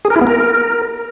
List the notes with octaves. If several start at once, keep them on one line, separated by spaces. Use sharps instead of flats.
G#4
A#4
E4
B3
A#4